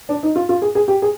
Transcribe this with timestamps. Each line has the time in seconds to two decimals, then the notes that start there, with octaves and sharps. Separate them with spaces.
0.09 D4
0.23 D#4
0.36 F4
0.49 F4
0.62 G#4
0.75 G#4
0.88 G4
1.02 G#4